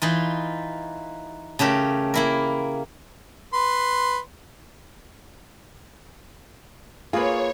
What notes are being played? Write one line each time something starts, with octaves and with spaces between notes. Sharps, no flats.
E3 D#4 F4
C#3 A3 G4 A#4
A#3 E4 A#4
B4 C6
A#3 F4 G#4 B4 C#5